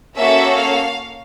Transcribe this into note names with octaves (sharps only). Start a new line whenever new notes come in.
A#3 C#4 F#4 A4 E5
F5